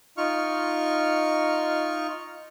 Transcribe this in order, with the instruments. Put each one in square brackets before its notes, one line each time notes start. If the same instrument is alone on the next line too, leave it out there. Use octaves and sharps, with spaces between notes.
[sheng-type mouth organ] D#4 F4 C#6 F6